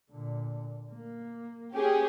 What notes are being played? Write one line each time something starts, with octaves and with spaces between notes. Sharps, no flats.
A#2 D3
A#3
C#4 G4 G#4